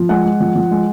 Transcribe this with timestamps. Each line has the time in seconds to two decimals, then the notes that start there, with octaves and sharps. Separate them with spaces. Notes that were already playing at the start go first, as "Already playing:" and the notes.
Already playing: F3
0.09 G#3 F#5
0.25 G#3
0.40 F3
0.55 F3
0.71 G#3